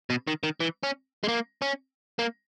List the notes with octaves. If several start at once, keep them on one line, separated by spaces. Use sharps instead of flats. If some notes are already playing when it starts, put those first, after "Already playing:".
B2
D#3
D#3
E3
C#4
G#3
A#3
C#4
A#3